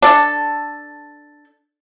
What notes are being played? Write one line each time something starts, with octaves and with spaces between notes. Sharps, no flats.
D4 A4